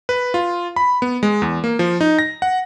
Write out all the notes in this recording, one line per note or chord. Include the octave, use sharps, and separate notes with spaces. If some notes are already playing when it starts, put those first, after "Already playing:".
B4
F4
B5
B3
G#3
E2
A#3
F3
D#4
A#6
F#5